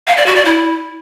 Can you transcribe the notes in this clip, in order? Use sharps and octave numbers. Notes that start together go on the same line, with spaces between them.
F5
D5
F#4
D5
E4